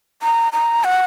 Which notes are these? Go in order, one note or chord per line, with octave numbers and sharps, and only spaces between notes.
A#5
A#5
F#5